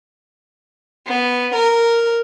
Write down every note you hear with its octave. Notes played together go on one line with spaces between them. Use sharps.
B3
A#4